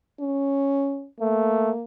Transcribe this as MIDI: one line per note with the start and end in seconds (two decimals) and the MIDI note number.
0.20 1.07 61
1.20 1.71 57
1.20 1.84 58